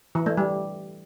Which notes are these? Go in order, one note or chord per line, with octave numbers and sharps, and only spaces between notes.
E3
A3
G3